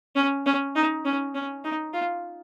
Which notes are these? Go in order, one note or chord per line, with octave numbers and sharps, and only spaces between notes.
C#4
C#4
D#4
C#4
C#4
D#4
F4